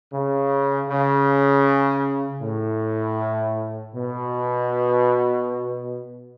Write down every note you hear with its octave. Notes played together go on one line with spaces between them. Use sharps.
C#3
C#3
A2
B2